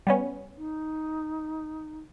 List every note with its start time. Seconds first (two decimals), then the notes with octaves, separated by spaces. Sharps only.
0.07 G3 B3 C#4
0.57 D#4